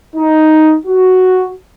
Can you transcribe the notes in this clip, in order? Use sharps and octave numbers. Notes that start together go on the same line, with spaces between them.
D#4
F#4